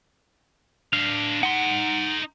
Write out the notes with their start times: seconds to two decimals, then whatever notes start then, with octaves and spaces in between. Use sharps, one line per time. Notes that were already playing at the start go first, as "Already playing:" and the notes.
0.93 D4 F5 F6
1.43 D#4 F#5 C6